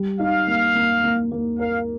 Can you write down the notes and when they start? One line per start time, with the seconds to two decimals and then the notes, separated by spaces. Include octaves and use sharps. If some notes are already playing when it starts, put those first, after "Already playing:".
Already playing: G3
0.19 D#4 F5
0.47 A#3
0.75 A#3
1.04 A#3
1.32 A#3
1.59 A#4 F5